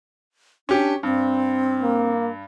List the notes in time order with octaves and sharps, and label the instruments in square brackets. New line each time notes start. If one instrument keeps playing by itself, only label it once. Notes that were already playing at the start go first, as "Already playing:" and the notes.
[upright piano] C#4 G4 [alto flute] D4
[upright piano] G2 [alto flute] C4
[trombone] A#3